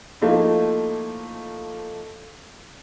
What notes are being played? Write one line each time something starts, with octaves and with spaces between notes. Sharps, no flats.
F3 A3 A#3 D#4 E4